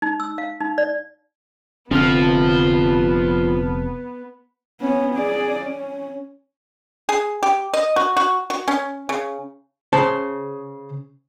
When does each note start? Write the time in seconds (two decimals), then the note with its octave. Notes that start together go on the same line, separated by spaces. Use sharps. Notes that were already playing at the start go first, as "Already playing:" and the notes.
0.02 D#4
0.20 E6
0.38 F5
0.61 D#4
0.78 D5
1.91 F1 D3 F3 B3 C4 A5 F6
4.81 B3 C#4
5.14 G#4 D5
5.60 C#4
7.09 G#4
7.43 G4
7.74 D#5
7.96 F#4
8.17 F#4
8.50 F#4
8.68 C#4
9.09 C#3
9.93 C#3 C5 A5